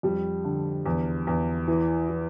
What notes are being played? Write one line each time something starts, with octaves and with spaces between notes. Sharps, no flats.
F2 G3
D3
E2
E2
E3
E3